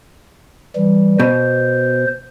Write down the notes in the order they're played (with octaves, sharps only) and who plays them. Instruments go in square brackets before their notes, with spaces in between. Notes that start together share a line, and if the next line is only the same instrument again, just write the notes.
[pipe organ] E3 G3
[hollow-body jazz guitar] B2 [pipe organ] C5